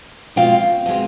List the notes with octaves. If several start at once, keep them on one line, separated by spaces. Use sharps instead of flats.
B2 G#3 C4 F4 F5 G5
B2 G#3 C4 F4